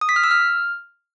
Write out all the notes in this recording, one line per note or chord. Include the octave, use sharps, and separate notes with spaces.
D#6
B6
F6
E6
F6